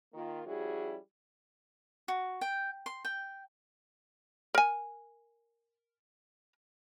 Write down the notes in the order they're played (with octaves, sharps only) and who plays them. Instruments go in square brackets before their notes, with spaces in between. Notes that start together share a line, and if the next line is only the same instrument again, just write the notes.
[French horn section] D#3 A#3 F4
F3 G3 C#4 E4 F#4 G#4
[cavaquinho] F#4
G5
C6
G5
[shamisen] A#4 G#5